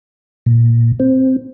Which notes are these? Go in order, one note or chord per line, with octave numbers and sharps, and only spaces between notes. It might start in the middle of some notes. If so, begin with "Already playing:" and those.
A#2
C4